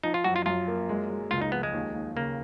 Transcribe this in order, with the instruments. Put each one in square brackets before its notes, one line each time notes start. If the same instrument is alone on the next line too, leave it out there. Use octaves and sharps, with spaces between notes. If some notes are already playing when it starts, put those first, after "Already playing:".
[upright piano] F3 [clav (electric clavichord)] D#4
[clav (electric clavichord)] F4
[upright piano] F#2 [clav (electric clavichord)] F#4
[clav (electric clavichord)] F4
[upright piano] F#2 [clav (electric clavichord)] F4
[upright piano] A#3
G#3
G#3
[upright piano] C#2 [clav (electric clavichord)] F4
[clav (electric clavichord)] D#4
[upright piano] F3 [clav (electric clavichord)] B3
[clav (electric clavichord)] G#3
[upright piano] D#2
D#2
[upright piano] C#3 [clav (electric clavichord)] A#3